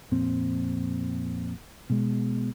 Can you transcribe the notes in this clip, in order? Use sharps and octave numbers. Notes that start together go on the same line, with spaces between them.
F2 A#2 C4
B2 G#3